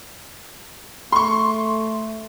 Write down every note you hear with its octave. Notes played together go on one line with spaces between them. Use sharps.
A3 C6 C#6